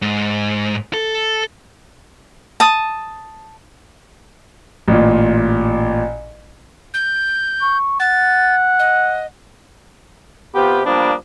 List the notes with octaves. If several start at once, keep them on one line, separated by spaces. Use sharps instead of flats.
G#2
A4
A5 D#6
A1 A#2
G6
C#6
F#5 A6
D#5
C3 B3 F4 G4
F3 G3 A#3 B3 D4